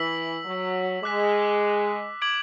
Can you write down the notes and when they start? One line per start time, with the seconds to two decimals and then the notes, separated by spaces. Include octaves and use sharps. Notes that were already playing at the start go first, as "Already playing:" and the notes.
Already playing: E3 E6 B6 F#7
0.45 F#3
1.03 G#3 D6 F#6 B6
2.22 D6 G#6 D7 F#7